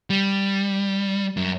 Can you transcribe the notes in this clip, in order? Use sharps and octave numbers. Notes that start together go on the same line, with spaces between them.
G3
F#2